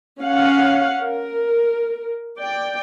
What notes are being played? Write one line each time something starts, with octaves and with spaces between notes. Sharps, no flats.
C#4 F5 F#5
A#4
D5 G5